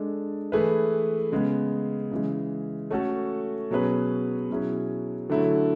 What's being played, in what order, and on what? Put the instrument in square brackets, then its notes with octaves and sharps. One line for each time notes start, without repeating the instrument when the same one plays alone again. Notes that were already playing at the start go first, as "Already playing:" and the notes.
Already playing: [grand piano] G#3 D4 A4
E3 A3 E4 G#4 B4
C#3 G#3 B3
C#3 E3 G#3
A3 C#4 F#4 A4
B2 F#3 C#4 G#4 B4
B2 F#3 C#4 E4 G#4
D3 F#3 A3 E4